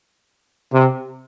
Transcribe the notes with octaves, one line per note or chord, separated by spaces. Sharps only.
C3